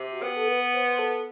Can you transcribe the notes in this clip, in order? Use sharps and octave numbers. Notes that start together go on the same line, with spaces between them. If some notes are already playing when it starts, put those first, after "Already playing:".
Already playing: C3
F#4
B3 G4
A4
B4
C5
A4